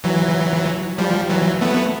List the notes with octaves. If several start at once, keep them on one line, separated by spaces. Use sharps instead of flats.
E3 F#3
F3 G3
E3 F#3
A3 B3